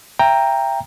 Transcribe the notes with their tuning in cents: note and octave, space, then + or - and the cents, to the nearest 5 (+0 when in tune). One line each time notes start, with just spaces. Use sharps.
E5 +30 G5 +15 A#5 +0